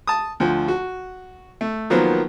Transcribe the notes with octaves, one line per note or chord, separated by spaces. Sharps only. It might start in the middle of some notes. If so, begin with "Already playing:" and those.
A5 D#6
D2 F3
F#4
A3
D#3 F3 F#3 A#3 B3 C5